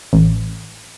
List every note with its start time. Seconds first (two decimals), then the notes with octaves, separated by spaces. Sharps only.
0.13 A1